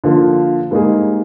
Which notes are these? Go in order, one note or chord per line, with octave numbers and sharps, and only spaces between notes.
D3 F3 A#3 F4
G#2 G3 A#3 D#4 G#4